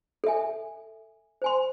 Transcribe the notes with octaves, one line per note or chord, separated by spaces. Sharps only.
A4 E5 G#5
C5 G#5 C6